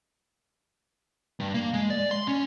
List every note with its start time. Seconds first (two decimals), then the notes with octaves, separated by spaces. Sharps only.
1.40 G2
1.54 A#3
1.73 G#3
1.90 D5
2.11 C6
2.28 C#4